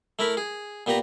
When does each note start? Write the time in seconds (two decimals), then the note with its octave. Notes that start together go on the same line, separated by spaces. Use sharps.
0.19 A3 E4 A#4 B5
0.37 G#4
0.86 A#2 B3 G4 B4 A#5